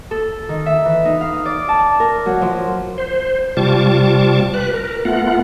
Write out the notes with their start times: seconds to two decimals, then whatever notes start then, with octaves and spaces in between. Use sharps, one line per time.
0.11 A4
0.49 D#3
0.66 E5
0.85 E3
1.05 D#4
1.21 F5
1.45 D5
1.69 A5
2.00 A#4
2.26 F#3
2.42 F3
2.98 C5
3.57 C3 G3 F4 A5 C#6 D6
4.54 B4 F#6
4.74 A#4
5.05 A3 B3 F4 F#5